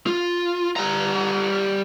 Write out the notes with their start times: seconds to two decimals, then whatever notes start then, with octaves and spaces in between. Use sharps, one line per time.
0.07 F4
0.76 G3 A#5